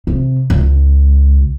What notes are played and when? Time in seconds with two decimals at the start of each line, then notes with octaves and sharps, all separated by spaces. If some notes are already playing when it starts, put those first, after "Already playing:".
0.07 C3
0.50 C#2